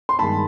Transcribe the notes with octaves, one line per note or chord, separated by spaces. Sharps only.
C6
G2 D#3 G#3 A5 B5